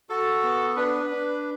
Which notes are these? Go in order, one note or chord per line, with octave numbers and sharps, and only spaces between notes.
F#4 A4
B3
D4 B4
D4